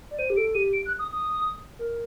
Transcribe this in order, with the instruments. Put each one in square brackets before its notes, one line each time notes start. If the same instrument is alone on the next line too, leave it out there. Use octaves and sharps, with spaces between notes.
[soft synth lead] D5
[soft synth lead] C5 [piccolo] D#7
[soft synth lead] G4
[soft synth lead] A4 [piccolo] D7
[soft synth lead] G4 [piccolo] D#7
[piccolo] D7
F#6
D#6
D#6
[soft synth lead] A#4